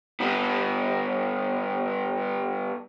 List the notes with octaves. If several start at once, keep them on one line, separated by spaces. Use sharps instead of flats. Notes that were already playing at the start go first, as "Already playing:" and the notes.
G2 B3